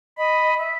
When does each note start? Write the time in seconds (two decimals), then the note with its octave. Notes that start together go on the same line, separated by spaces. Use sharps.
0.17 D#5 B5
0.58 E5